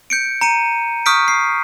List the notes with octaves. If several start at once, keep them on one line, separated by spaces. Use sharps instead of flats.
G6 C#7 D7
A#5 C#7 D#7
C#6 D#6 F6 G6 B6 D7
C7